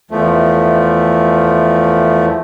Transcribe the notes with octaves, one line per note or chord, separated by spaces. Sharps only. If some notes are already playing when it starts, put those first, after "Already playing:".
E2 F3 A3